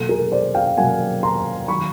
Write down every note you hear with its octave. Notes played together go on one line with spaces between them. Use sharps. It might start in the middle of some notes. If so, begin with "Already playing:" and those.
Already playing: B2 F#3 A#3 A4
G#4 A#4
C5 D5
F5 G5
B2 F#3 A#3 F#5 G#5
A#5 C6
D#3 F#3 B5 C#6